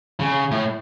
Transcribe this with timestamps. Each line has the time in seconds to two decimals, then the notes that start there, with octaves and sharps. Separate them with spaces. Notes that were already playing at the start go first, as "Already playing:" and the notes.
0.20 C#3
0.51 A2